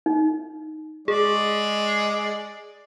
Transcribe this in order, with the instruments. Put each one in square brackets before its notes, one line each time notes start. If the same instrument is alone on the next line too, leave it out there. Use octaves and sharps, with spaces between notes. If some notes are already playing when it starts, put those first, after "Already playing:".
[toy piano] D#4
[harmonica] G#3 D5 [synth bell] G#4